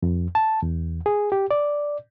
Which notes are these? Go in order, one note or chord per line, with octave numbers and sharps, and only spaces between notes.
F2
A5
E2
G#4
G4
D5